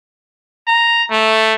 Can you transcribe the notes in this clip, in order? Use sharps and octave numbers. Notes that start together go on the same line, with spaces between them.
A#5
A3